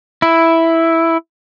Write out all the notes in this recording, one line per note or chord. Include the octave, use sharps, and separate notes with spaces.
E4